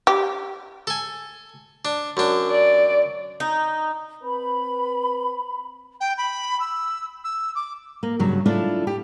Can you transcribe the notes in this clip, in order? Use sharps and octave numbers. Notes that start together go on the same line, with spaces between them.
G4
A4 G#5
D4
F#2 D4
D5
D#4
C4 B4 B5
G5
B5
E6
E6
D6
A#3
G2 C#3 F#3
A3 D4 E4 F4 A4
G4